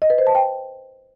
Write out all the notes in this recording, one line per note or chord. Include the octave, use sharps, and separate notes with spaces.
D#5
B4
C5
A5
G5